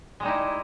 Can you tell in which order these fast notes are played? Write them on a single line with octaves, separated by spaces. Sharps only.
G#3 G3 D#4 E4